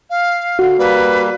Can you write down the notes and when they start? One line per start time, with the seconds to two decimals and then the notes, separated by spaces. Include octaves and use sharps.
0.10 F5
0.59 D3 F#4
0.79 G3 A#3 B4